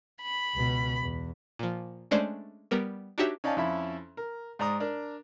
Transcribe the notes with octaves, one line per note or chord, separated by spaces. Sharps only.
B5
C#2 B2
E2
A#2 F3
G#3 A3 C#4 D4 C5 D5
G3 B3 A#4
D4 D#4 F#4 G4 C#5 E5
C#4 D#4 D5 F5 G#5 A5
F2 C#4 E4 E5 B5
A#4
G#2 D5 A#5 D#6
D4 A#4 D5